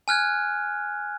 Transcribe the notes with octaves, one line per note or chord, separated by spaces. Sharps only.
G#5 F6 F#6 G#6